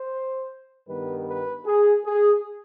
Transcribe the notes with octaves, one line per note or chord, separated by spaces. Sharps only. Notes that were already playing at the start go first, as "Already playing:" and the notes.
Already playing: C5
G2 D#3 G3 B3 B4
B4
G#4
G#4